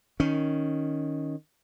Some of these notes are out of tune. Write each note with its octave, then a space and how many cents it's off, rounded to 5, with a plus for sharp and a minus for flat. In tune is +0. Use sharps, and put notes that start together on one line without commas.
D#3 +0 C#4 +0